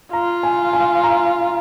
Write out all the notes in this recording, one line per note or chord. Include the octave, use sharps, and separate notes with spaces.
F4 A#5
G#5
G#5
A#5